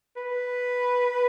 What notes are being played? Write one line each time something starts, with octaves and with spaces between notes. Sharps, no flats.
B4